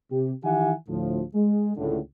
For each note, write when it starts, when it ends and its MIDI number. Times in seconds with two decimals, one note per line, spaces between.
0.12 0.32 48
0.12 0.32 67
0.44 0.73 51
0.44 0.73 52
0.44 0.73 67
0.44 0.73 76
0.44 0.73 78
0.44 0.73 80
0.88 1.21 38
0.88 1.21 45
0.88 1.21 53
1.34 1.71 56
1.77 1.98 37
1.77 1.98 45
1.77 1.98 50